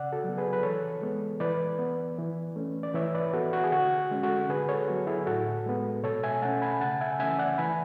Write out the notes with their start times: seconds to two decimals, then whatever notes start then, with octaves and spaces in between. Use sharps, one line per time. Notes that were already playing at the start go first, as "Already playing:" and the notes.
Already playing: C#3 D5 F#5
0.12 F#4 A4
0.24 F#3 B3
0.38 G#4 B4
0.53 B4
0.63 E3 A4 C#5
1.02 G#3 B3
1.40 E3 B4 D5
1.79 B3
2.19 E3
2.56 A3 C#4
2.83 D5
2.95 E3 C#5 E5
3.15 B4 D5
3.33 B3 F#4 A4
3.53 F#4
3.64 G#4
3.72 D3 F#4
4.11 G#3 C#4
4.23 F#4 A4
4.49 D3 G#4 B4
4.69 A4 C#5
4.88 F#3 B3 F#4
5.07 E4 G#4
5.27 A2 F#4 A4
5.66 G#3 B3
6.03 B2 A4 C#5
6.23 E5 G#5
6.42 A3 C#4 F#5 A5
6.62 G#5 B5
6.81 C#3 F#5 A5
7.01 E5 G#5
7.20 E3 A3 C#4 E5 G#5
7.39 D5 F#5
7.58 E3 G#5 B5